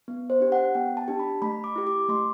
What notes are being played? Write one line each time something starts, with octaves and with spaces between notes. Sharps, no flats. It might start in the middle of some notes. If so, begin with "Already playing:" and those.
B3
C5
D4 G4
F#5
B3 G5
A5
D4 G4
B5
A3 B5
D6
E4 G4
D6
A3 C6